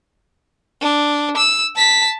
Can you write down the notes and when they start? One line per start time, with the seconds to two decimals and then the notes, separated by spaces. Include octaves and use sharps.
0.81 D4
1.37 E6
1.76 A5 B6